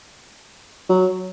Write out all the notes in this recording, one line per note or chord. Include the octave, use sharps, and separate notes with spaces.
F#3